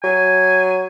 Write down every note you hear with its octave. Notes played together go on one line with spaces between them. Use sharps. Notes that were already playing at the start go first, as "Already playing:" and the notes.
F#3 G#5